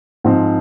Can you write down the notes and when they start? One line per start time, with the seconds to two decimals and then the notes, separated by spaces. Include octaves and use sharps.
0.24 G#2 F3 C4